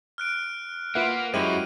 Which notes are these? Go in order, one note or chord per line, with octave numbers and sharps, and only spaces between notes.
F6 F#6 D7
A#3 F4 B4 E5 F#5
F#2 F#3 G#3 E4 G4 C5 D#7